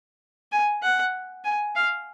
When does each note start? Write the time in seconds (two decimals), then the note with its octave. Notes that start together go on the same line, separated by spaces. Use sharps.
0.52 G#5
0.83 F#5
1.44 G#5
1.75 F5